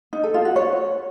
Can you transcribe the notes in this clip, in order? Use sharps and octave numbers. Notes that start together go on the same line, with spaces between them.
D#4
A4
F4
F#4
C#5